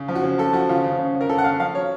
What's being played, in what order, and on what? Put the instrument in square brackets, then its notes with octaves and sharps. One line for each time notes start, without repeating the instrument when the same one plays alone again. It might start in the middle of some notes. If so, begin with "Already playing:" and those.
Already playing: [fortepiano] C#3
F3
F#4
C#3
F3 A4
F3 F#4
C#3 F4
C#3
C#3
C#3
A#4
C#3 A4
F#5
C#3 F5
F3 F5
F#3 C#5